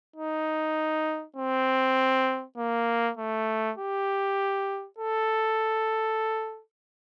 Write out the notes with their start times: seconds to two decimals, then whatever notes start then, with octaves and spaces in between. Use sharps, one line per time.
0.16 D#4
1.37 C4
2.57 A#3
3.17 A3
3.78 G4
4.98 A4